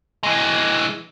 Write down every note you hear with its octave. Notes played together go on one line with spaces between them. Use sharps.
E3 G#3